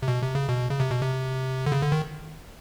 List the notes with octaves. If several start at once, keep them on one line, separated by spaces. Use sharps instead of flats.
C3
B2
C3
C#3
B2
C#3
C3
B2
C3
D3
C#3
D3
D#3